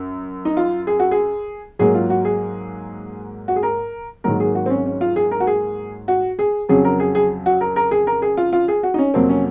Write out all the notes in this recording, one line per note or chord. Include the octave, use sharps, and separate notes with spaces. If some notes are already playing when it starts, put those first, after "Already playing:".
Already playing: F#2
D#4
F4
G#4
F#4
G#4
G#2 F#3 A#3 G#4
F4
F#4
G#4
F#4
G#4
A#4
G#2 D#3 F#3 A#3 A#4
G#4
F#4
C4
C#4
C#4
F4
G#4
A#4
F#4
G#4
F#4
G#4
F2 C#3 F#3 G#4
A#4
G#4
G#4
F#4
A#4
A#4
G#4
A#4
G#4
F4
F4
G#4
F#4
D#4
C#4
F2 C3 F#3 A#3 C4
C#4